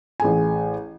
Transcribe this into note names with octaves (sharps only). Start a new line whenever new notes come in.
A1 G#4 G#5